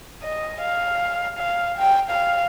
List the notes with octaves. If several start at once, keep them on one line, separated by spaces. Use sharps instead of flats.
D#5
F5
F5
G5
F5